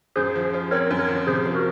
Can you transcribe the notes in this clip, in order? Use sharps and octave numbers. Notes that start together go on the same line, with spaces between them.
F#2 G#4 C5
F3
F4
C4 A#4 C#5
F#2
A#4 C#5
F3
C3 G#4 C5
F3
F#4 A#4